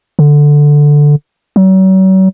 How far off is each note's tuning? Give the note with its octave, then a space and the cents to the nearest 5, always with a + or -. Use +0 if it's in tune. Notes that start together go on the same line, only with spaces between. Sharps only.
D3 +0
F#3 +40